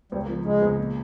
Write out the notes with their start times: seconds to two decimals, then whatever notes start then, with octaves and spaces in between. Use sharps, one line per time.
0.12 C#2 G3
0.23 A#3
0.29 F3
0.45 C#3 G#3
0.62 C#2
0.78 A#2